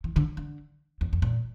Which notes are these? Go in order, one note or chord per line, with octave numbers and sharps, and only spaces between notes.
E3
D3
D3
E2
F2
A#2